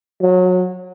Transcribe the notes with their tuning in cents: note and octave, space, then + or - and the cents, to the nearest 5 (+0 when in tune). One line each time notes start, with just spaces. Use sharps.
F#3 -25